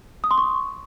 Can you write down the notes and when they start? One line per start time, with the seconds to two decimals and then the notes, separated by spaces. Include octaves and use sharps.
0.24 D#6
0.31 C6
0.38 C#6